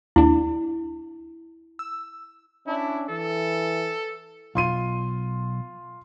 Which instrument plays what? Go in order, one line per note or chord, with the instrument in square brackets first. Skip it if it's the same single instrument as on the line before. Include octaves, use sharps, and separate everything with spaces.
[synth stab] D#2 D4 [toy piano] E4
[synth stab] E6
[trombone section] C#4 D4 [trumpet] E4
[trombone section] E3 [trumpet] A4
[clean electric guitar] B1 [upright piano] F4 C6 D#7